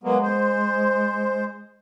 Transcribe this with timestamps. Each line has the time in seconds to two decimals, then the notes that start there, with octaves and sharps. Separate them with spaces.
0.04 F#3 G#3 A#3 B3
0.23 C5